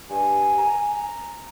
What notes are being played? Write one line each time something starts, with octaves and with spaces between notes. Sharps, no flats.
G2 G#5
A#5